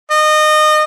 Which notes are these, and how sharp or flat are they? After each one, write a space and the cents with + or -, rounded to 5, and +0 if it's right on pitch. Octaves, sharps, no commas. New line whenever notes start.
D#5 -25